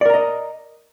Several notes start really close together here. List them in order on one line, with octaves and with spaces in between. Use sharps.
D5 A#4 A#5 D#5